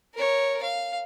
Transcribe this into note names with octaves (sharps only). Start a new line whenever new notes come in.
A#4 C#5
F5